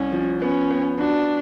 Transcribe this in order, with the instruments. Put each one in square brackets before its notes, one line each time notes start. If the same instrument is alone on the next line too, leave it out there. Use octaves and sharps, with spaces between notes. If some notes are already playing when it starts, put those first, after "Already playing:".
Already playing: [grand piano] C2 [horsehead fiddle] C#4
[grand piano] F3
[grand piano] B3 [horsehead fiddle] C#4
[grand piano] B3
[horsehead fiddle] D4 [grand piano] F#4